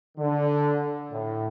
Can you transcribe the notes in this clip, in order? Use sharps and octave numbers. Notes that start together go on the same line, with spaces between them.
D3
A2